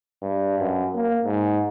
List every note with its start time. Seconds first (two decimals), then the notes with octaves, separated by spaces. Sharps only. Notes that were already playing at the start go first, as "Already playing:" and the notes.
0.22 G2
0.58 F#2
0.95 A#3
1.24 G#2